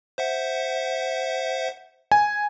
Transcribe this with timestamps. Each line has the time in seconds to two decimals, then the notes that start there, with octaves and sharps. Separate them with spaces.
0.18 C5 E5 F#5
2.12 G#5